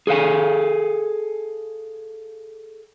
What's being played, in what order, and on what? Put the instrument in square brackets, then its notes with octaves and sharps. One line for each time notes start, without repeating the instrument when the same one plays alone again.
[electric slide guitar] G#4 A4 D#5 F5 G#5